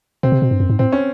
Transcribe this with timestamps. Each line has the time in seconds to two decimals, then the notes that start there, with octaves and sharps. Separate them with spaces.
0.23 B2 C4
0.32 C3
0.42 B2
0.51 G2
0.60 F#2
0.69 G#2
0.79 A2 C4
0.92 C#4